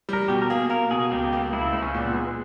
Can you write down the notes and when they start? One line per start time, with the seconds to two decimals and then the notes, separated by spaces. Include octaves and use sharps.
0.09 G3 A#4
0.28 B2 G4
0.42 A#4
0.50 A#3 G#4
0.70 A#3 A#4
0.91 B2 G#4
1.11 C#2 G4
1.33 A#3
1.53 C#2 E4
1.73 C#2
1.82 C#4
1.93 A#2 B3
2.14 G#3